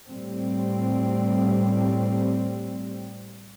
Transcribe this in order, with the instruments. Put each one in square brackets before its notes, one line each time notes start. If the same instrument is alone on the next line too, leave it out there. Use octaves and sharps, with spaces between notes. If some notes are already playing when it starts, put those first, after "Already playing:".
[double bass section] A2 G3 C4